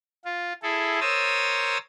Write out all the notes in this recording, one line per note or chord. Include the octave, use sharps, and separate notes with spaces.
F4
E4 G#4 A4
A#4 C5 C#5 D#6 E6 A6